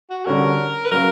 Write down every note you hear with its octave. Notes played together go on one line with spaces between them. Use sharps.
F#4
D3 G3 C#4 F#4 A#4
B4
C#3 F#3 A#4